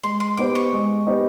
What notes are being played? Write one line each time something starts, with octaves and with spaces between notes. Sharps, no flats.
G#3 C6
C6
B3 D#4 G4 C5 D6
C#6
G#3
B3 D#4 G4 C5